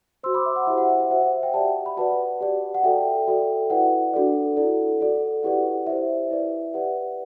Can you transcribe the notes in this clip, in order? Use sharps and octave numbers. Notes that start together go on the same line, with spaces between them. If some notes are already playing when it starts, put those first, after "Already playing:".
F#4 C5 C6 E6
B5 D6
E5
F#5
E4 G4 C5 E5
F#5
E5
E5
F#4 C5 F#5
E5
F#5
E5 G5
G4 D5 F#5 A5
B5
F#4 B4 D5 F#5 A5
G4 D5
F#5
F#4 A4 D5 E5 G5
F#4 A4 D5
E4 B4 D5 F#5
D4 F#4 A4 D5
E4 A4 D5
F#4 A4 D5
E4 G4 B4 D5 F#5
E4 G4 C5 E5
E4 B4 D5
G4 B4 D5 F#5